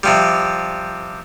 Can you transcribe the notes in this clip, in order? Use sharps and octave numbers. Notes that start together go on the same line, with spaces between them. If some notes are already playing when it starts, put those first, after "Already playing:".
C3 F3 G3